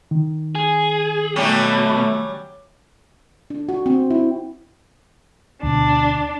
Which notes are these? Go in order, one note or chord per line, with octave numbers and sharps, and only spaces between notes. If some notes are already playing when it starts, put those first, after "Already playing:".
D#3
G#4
B2 F#3 G3 A3 C#4
D4
F#4
C4
E4
D2 B2 D4